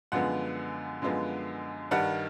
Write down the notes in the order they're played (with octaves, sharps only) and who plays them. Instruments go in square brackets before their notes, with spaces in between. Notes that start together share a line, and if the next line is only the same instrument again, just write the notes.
[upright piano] F#2 D3 F3 G#3 B3 F#5
F#2 D3 F3 G#3 B3
G2 D#3 G3 F#5